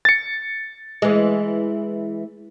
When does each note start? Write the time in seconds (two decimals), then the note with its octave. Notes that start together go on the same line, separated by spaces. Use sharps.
0.05 A6 C#7
1.02 E3 G#3